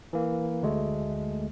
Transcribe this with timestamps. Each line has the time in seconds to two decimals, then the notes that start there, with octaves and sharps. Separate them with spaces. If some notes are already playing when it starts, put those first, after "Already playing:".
0.13 E3 A#3
0.62 D2 G#3 A3